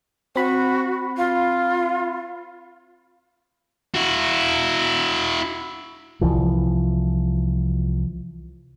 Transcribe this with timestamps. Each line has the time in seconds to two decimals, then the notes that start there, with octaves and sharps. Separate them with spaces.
0.36 C4 F#4 B5
1.17 F4
3.95 E4 F#4
6.21 C2 E3 F3